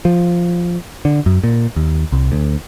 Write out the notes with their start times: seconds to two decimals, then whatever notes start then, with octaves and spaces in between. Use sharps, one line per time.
0.05 F3
1.05 D3
1.26 F#2
1.44 A#2
1.76 D#2
2.12 C2
2.32 D2